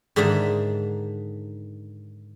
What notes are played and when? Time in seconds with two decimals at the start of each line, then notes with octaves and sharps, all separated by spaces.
0.16 G#2 D3 D#3 D4 E5 A#5